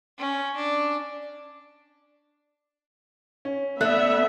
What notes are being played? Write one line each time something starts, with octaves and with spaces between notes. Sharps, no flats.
C#4
D4
C#4
A3 B3 D5 E5 F#5 F#6